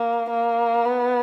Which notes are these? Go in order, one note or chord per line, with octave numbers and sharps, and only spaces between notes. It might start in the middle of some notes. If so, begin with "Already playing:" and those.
Already playing: A#3
A#3
B3